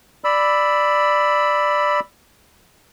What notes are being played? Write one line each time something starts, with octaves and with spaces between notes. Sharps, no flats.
D5 B5 E6